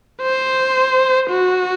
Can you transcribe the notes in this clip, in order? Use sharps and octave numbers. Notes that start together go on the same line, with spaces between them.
C5
F#4